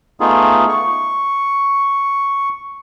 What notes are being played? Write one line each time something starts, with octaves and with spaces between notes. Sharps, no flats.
A3 B3 D#4 F4 G#4
C#6